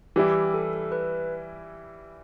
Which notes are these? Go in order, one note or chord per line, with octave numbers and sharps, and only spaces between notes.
E3 G3 E4 G4
A4
B4